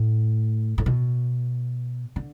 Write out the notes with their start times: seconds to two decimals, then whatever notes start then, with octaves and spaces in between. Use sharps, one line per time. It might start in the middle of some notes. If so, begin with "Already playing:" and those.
Already playing: A2
0.78 A2
0.86 B2
2.16 D3